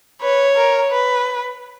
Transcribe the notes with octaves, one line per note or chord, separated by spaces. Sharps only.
B4 C#5
A#4
B4